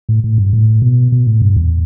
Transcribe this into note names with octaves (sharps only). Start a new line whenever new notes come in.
A2
A2
G2
A2
B2
B2
A2
G2
E2